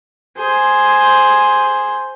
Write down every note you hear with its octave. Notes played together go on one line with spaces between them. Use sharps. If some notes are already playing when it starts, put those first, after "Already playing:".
G#4 C5